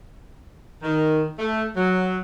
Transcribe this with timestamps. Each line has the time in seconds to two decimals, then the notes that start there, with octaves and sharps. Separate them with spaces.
0.83 D#3
1.39 A3
1.75 F#3